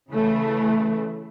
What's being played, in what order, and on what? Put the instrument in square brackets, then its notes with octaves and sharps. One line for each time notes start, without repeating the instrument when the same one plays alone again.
[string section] C#3 E3 A3